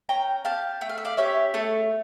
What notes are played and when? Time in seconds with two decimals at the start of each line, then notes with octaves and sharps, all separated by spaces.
0.09 C#4 G5 A#5
0.45 G4 F5 A5
0.81 A3 G5
0.89 F5
0.98 E5
1.05 D5 F5
1.17 C#4 G4 C#5 E5
1.54 A3 A4 C#5